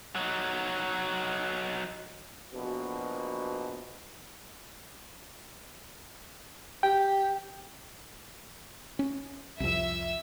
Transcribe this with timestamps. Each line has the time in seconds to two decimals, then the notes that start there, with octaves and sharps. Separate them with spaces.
0.16 F#3 D#4
2.53 A#1 B2
6.83 G4 G5
8.99 C#4
9.60 C2 F2 E5 E6